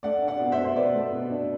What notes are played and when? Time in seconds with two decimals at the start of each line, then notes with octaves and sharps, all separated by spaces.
0.03 A3 D5 F#5
0.22 D4
0.28 D5 F#5
0.40 B2
0.52 C5 E5
0.58 B2
0.65 C5
0.75 B2 B4 D5
0.94 A3
1.13 B2
1.31 D4